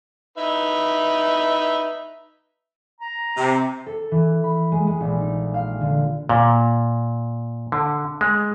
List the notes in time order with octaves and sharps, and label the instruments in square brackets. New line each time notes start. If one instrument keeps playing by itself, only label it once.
[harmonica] D#4 B4 E5
[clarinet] A#5
[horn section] C3
[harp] A4
E3
B5
G#3
G#3
A#1
D#4
F5
D3
[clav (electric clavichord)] A#2
D3
G#3